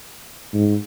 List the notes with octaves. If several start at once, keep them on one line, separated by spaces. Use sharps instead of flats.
G#2